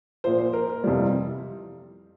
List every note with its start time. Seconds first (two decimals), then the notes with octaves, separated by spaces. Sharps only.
0.24 A#2 F3 C5
0.38 C5
0.53 A#4
0.69 A#4
0.84 F2 C3 E3 G3